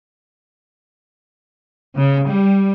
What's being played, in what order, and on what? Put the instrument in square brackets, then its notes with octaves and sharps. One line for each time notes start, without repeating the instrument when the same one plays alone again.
[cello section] C#3
G3